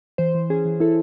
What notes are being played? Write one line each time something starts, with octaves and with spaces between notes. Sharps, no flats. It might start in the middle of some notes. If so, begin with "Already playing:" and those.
E3 C5
E3
C#4 G#4
E3
E4 A4